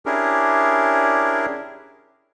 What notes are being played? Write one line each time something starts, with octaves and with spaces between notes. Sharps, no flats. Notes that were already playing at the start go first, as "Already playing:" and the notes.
C#4 D4 E4 G4 G#4 A#4